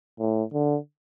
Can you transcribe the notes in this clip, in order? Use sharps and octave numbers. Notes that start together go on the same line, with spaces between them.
A2
D3